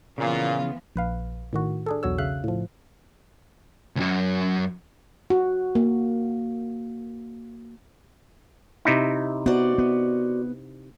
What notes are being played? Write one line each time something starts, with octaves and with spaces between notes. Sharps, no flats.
A#2 C#3 E3 F3 B3 F4 F5
A#1 B4 F5
A2 D#3 F#4
D4 G#4 A4
B1 E2 F#4 C#5 E6
C#3 E5 F5 F#6
A2 F3
C#2 F#2
F#4
A#3
C3 D#4 E4
B3 F#4 C5 D5
B3